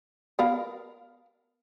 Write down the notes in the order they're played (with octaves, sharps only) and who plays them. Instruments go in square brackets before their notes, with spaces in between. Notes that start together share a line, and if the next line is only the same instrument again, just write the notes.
[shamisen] B3 A#4 F5